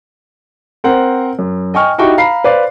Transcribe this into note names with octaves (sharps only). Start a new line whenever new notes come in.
C4 A#4 C5 F#5
F#2
D#5 G5 G#5 C#6 F6
D#4 E4 F#4 G4 G5 C#6
F5 A#5 B5 C7
B4 C5 D5 F5